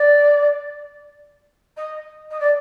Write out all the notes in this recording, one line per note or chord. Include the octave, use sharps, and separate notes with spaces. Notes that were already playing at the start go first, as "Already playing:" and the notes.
Already playing: D5
D#5
D#5
D5